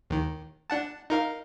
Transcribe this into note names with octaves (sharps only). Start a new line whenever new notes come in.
D#2 D#3
D4 F#5 A5
D#4 A#4 F5